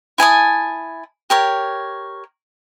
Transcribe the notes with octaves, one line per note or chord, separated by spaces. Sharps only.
E4 G#5 A5 D#6
G4 A#4 C#5